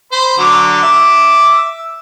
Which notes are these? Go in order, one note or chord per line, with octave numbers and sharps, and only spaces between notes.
C5 B5
D3 F#3 D6
E5 D6 E6